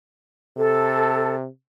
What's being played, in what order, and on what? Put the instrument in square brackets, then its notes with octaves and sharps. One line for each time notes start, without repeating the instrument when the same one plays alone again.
[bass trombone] C3 [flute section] A4